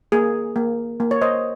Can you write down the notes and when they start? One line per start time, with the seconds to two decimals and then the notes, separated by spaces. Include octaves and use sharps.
0.12 A#3 G#4
0.56 A#3
1.00 A#3
1.11 C#5
1.22 C5 D#5